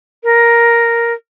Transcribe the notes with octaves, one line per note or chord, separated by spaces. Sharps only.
A#4